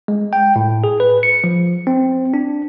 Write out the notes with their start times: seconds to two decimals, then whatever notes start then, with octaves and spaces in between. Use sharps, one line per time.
0.08 G#3
0.33 G5
0.56 A2
0.84 G#4
1.00 B4
1.23 C#7
1.44 F3
1.87 C4
2.34 D4